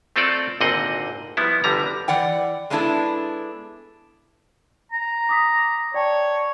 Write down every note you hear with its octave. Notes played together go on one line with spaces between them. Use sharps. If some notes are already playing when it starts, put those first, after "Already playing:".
A3 C4 F4 A4 D5
G#1 A#2 D3 C4 D#5 F#5
F3 G3 B3 E4
G1 D3 G3 A#5
E3 D5 F#5 G5
G#3 A3 B3 D4 E4 A4
A#5
D6 D#6 B6
C#5 D5 G5 A5